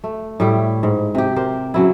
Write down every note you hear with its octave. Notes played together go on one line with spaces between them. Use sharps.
A3
A2 G3 E4
G#2
C3 G4
G4 A#4 C5
C#3 F#3 E4